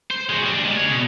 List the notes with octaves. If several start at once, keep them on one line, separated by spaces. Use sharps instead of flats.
C5
G#3 F#4
G3 D4
G#3 D4
G#4 C#5
B2